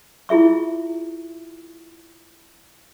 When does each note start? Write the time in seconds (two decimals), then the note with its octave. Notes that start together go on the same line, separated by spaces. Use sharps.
0.29 E4 F4 G#4 E5 C#6